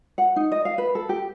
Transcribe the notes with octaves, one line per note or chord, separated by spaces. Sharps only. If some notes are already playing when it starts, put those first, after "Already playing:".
F#5
D#4
D#5
F5
B4
A4
G4